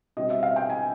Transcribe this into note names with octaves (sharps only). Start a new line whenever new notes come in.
B2 G3 C4 D#5
E5
F5
G5
G#5